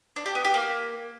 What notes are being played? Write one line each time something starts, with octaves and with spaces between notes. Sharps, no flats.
D4
G4
B3
G4
A#3